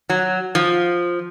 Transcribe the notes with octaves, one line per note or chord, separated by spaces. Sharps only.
F#3
F3